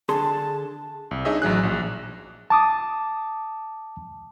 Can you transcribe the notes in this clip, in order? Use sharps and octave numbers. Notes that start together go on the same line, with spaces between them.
D3 G#4 A5 C6
C2
D4 D#4 G#4 C#5 D#5 E5
A1 F#3 G#4 F#6
A#1
A5 D6 D#6